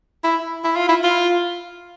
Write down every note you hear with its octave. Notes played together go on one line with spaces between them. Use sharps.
E4
E4
F4
E4
F4